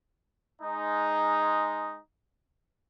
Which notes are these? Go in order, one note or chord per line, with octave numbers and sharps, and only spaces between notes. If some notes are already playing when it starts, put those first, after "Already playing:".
G#3 D#4